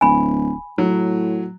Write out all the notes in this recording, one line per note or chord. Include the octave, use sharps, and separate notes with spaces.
D1 G#5 B5
A2 F#3